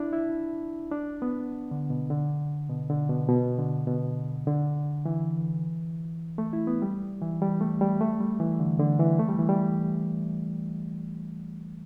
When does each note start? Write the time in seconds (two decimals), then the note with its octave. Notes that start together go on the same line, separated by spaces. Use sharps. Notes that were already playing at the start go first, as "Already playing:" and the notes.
Already playing: D4 E4
0.13 E4
0.92 D4
1.22 B3
1.71 D3
1.90 B2
2.10 D3
2.69 B2
2.89 D3
3.09 B2
3.28 B2
3.58 D3
3.87 B2
4.47 D3
5.05 E3
6.38 A3
6.53 E4
6.67 B3
6.82 G3
7.22 E3
7.42 G3
7.61 A3
7.81 G3
8.01 A3
8.20 G3
8.40 E3
8.60 D3
8.79 D3
8.99 E3
9.19 A3
9.28 G3
9.39 E3
9.49 G3